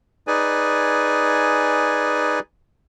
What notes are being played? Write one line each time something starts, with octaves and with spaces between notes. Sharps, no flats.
D#4 G#4 B4 D5 G#5